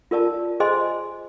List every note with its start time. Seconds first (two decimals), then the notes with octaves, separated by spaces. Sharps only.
0.11 F4 A#4 D5 A5
0.60 G#4 C5 D#5 G#5 C6